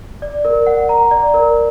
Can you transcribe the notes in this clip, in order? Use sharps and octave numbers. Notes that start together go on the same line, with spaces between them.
D5
A#4
F#5
A#5
D5
A#4